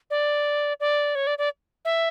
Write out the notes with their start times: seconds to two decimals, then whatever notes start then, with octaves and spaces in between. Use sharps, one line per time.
0.10 D5
0.80 D5
1.15 C#5
1.27 D5
1.38 D5
1.85 E5